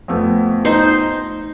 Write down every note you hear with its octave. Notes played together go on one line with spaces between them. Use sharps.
F2 A3 B3
D#4 C5